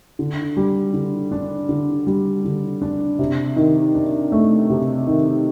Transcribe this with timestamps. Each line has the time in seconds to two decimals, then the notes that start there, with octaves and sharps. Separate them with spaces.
0.19 D3
0.57 G3
0.93 D3
1.31 D4
1.69 D3
2.07 G3
2.44 D3
2.82 D4
3.19 C3
3.56 D#3
3.95 D4
4.32 A3
4.70 C3
5.07 D#3